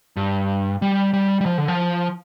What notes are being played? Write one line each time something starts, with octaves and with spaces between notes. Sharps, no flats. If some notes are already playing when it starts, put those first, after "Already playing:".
G2
G3
G3
G3
F3
D3
F3